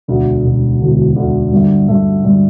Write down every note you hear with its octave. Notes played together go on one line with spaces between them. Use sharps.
E1 D2 D3
E1 D2 D3
E1 D2 D3
E1 D2 D3
G2 D3 A3
G2 D3 A3
G2 D3 A3